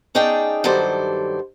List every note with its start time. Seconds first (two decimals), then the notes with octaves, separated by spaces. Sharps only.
0.15 C#4 D#4 G#4 D5 G5 A5
0.64 G2 D#3 F#3 A4 C5 D5